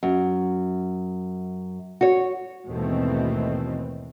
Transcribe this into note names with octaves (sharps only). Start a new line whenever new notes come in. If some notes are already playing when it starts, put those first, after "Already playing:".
F#2
F#4 C#5
D#2 G#2 B2 E3 A3 C4